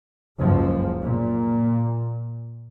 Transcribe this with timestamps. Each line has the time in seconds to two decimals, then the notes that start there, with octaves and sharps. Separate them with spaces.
0.38 F#1 C#2 F3
1.03 A#2